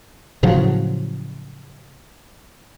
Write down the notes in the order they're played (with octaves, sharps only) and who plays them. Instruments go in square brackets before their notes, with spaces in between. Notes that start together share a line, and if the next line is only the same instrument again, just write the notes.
[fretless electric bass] A2 C#3 F3 F#3